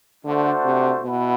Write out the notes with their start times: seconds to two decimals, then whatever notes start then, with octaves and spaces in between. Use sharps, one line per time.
0.25 D3 A3 D4 F#4 C5 F#5
0.64 C3
1.02 B2 E4 B4 F#5